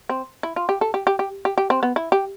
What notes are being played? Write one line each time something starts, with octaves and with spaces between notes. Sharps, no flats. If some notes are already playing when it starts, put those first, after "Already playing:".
C4
E4
F4
G4
A4
G4
G4
G4
G4
G4
C4
B3
E4
G4